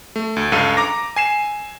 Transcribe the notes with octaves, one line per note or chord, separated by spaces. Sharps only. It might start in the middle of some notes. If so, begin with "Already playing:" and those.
A3
D2
C#2 G2 A4 F5 E6 D#7
A#5 D6 A#6
G#5 C7 E7